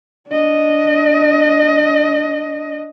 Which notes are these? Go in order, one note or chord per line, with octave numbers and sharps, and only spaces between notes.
D4 D#5